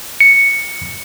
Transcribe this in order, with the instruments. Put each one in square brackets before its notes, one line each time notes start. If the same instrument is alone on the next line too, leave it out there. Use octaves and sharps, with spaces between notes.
[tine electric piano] C#7